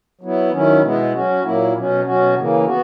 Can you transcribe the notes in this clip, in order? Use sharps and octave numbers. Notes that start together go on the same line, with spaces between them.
F#3 B3 E4
D#3 F#3 C#4 E4
B2 G#3 B3 E4
F#3 C#4 F#4
A#2 F#3 A#3 E4
B2 F#3 C#4
B2 F#3 C#4 F#4
C#3 E3 A#3
B3 F#4